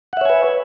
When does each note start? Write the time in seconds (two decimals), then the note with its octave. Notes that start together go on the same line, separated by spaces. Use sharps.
0.13 F#5
0.17 E5
0.21 C#5
0.25 G#5
0.30 B4